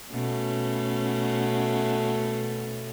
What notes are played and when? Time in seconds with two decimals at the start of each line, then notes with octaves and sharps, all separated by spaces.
0.11 B2 A3 C#4